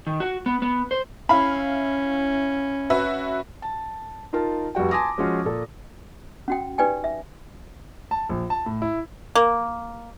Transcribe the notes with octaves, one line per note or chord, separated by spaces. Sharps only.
D#3
F#4
B3
B3
C5
C#4 E4 F5 B5
F#4 B4 E5
A5
D#4 F4 A#4 A5
F1 G3 F#4 G5
G#5 A5 C6 D6 D#6 A#6
F3 G#3 C#4 F4 F#4
A#2 A4
C#4 F#4 G5
D#4 G4 B4 D5 G5 G#5
E5
A5
A#1
A5
A2
E4
A#3